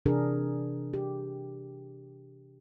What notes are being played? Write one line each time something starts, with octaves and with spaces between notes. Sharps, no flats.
C3 E3 D4 G#4 A#4
G4